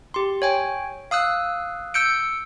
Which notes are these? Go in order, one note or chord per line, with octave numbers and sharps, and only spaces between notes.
G4 C6
C#5 G5 G#5
F5 D#6 E6 F#6
E6 G6 C#7 D7